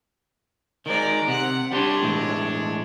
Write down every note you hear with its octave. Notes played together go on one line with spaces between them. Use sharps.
D#3 G#3 D5 A#5
C3 F#5
G3 D4 G4 C#5 C6
A2 E3 G#3